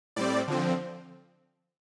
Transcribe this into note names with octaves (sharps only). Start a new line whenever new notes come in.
A2 G3 C4 D5
D3 F3 C4